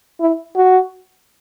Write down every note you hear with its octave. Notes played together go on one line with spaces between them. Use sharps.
E4
F#4